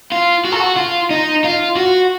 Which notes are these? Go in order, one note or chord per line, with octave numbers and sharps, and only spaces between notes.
F4
F#4
A4
F#4
F4
D#4
F4
F#4